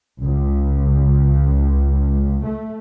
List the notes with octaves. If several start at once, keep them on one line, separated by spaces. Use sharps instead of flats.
C#2
A3